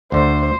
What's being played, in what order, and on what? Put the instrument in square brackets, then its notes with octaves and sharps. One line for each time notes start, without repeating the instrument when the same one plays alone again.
[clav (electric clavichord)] D2 D3 A3 [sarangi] C5